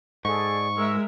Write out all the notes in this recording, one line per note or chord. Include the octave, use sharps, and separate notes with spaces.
G#2 G#4 A4 D5 C#6
G#3 A#4 E5 E6